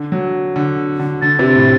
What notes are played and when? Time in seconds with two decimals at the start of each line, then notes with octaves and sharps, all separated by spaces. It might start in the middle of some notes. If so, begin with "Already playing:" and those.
Already playing: D3
0.12 F#3
0.56 D3
1.00 D3
1.22 D3 A6
1.39 C3
1.55 A2